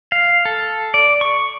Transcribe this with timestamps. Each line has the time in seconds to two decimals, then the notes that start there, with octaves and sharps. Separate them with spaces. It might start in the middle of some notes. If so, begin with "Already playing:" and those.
0.12 F5
0.45 A4
0.94 D5
1.21 C#6